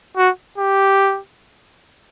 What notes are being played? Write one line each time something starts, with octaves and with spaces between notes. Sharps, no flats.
F#4
G4